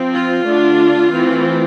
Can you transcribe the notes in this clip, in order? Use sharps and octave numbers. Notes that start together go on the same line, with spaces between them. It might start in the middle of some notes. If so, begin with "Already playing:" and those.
Already playing: F3 C4
F4
D3 A3 D4
E3 A3 C4